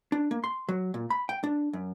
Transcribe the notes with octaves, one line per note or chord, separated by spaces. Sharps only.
D4
A#3
C6
F#3
A#2
B5
G5
D4
F#2